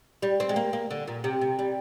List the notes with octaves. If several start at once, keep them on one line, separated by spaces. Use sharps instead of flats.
G3
C4
G#3
A#3
A#3
D3
A#2
C3
C3
G3